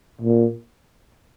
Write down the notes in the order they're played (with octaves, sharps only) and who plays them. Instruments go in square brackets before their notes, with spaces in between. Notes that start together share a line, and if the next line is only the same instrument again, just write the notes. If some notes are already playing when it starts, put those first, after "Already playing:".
[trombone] A#2